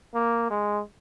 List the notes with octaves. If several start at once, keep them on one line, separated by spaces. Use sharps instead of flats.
A#3
G#3